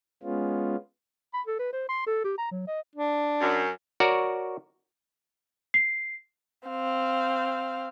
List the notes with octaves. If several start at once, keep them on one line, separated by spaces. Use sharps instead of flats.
G#3 B3 C#4 F4
B5
A4
B4
C5
C6
A4
G4
A#5
F#3
D#5
D4
F#2
F#4 A#4 C#5 D5
C7
C4 F5